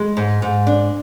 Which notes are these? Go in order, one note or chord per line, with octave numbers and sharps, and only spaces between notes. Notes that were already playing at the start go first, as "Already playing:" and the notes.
Already playing: G#3
G#2
G#2
D4